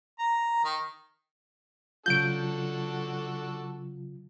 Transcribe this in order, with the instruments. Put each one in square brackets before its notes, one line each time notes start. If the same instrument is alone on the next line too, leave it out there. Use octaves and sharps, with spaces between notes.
[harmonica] A#5
D#3
[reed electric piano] C#3 F#3 F4 [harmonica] D4 F#4 A4 [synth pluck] G6 D7